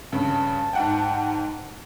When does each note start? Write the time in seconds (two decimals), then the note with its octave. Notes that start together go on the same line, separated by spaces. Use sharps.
0.12 G2 C#3 A5
0.73 G#2 F#5 G5